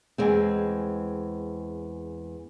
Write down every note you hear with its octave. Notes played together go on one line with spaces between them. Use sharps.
E2 G#3 C4